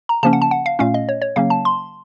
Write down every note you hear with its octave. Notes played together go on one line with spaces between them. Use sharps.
A#5
C#3 F3 A#3 C#4 A5
F#5
A5
F#5
F5
A#2 A3 C#4 F5
D#5
C#5
C#5
C#3 F#3 A#3 C#4 F5
A5
C6